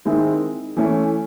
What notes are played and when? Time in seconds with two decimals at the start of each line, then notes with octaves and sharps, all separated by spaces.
0.05 D#3 G#3 C4 E4
0.77 E3 A3 C#4